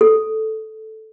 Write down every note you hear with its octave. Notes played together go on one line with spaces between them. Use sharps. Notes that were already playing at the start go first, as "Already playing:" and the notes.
A4